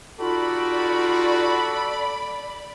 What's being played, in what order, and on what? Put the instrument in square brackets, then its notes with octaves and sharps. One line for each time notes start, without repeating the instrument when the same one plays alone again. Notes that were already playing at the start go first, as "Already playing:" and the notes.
[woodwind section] G3 D#4 F4 [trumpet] F#4 [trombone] A4 [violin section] D5 B5